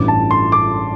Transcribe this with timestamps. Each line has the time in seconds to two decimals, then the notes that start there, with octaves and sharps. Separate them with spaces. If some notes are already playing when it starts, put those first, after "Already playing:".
Already playing: A1 G2 E3 D6
0.08 A5
0.31 C6
0.52 D6